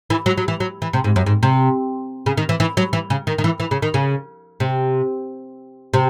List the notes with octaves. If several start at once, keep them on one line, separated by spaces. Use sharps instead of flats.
E3
F#3
F#3
E3
F#3
E3
C3
G#2
F#2
G#2
C3
C#3
D#3
E3
E3
F#3
E3
C#3
D#3
D#3
E3
E3
C#3
D#3
C#3
C3
C3